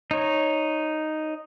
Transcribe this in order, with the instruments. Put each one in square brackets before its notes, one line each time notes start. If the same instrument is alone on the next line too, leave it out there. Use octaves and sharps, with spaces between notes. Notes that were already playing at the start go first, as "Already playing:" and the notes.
[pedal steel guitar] D#4 C#5